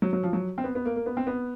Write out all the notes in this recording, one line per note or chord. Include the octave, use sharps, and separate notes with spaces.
F#3
F#3
F3
F#3
C4
B3
B3
A#3
A#3
B3
C4
B3